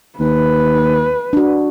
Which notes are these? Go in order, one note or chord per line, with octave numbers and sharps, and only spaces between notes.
D#2 B4
D4 F#4